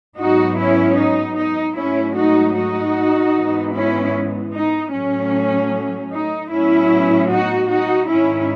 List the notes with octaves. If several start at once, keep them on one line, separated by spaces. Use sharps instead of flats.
G#2 F#3 B3 D#4 F#4
C#4 E4
D#4
D#4
G#2 F#3 A3 C#4 E4
D#4 F#4
D#4 F#4
G#2 E3 G#3 B3
C#4 E4
D#4
A2 F#3 A3 C#4
D#4
A2 F#3 B3 C#4 E4
D#4 F#4
D#4 F#4
G#2 D#3 G#3 C#4 E4